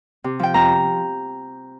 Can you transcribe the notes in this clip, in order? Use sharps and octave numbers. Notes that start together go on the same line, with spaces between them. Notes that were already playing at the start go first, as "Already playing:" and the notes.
C3
F3 G5
F2 A#5